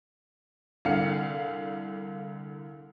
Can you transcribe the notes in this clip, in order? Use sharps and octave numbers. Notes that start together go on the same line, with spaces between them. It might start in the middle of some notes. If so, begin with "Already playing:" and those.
C2 D3 F5 C#7